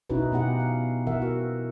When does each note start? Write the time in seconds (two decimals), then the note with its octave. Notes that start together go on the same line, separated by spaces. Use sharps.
0.10 B2 C#4 D#4 E4 F#4 B4
0.32 B2 B3 G4 F#5
0.60 F5
1.07 E3 A#4 E5 F#5
1.22 F#4